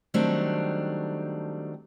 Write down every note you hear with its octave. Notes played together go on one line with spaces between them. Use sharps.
D#3 F#3 G3 A3 C4 D4